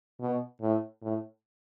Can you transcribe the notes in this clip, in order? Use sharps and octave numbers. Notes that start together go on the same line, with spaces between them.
B2
A2
A2